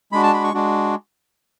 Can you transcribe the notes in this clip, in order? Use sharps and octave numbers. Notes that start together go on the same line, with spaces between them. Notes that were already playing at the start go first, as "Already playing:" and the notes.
G#3 D4 F#4 B5
A5
B5
C#6
G#3 D4 F#4